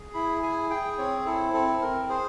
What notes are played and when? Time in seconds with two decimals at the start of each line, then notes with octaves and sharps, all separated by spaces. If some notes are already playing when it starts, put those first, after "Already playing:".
Already playing: G#4
0.14 E4 B5
0.43 G#4 G#5
0.70 G#4 G5
0.98 C4 C#5
1.26 E4 A4
1.53 C4 A4
1.81 C4 A#4
2.09 G#4 C5